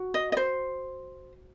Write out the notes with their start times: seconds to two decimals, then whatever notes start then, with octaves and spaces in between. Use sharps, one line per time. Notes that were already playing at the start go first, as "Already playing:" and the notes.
Already playing: F#4
0.14 D#5
0.32 D#5
0.37 C5